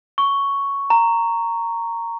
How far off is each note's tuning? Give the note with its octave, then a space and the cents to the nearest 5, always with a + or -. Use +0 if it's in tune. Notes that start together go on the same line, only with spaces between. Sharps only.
C#6 +5
A#5 -10